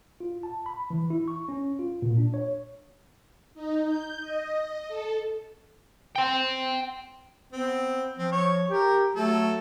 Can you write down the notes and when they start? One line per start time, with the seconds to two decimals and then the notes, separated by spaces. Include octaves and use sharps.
0.20 F4
0.43 A5
0.66 B5
0.90 E3
1.10 E4
1.28 C#6
1.49 C#4
1.79 F4
2.02 A#2
2.17 D4
2.34 C#5
3.55 D#4
3.86 G6
4.21 D#5
4.88 A4
6.16 G5 C6
7.53 B3 C4
8.18 F3 C4
8.32 C#5
8.70 G4 A#4
9.15 F#3 A3 A4